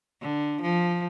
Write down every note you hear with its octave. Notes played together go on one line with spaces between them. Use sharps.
D3
F3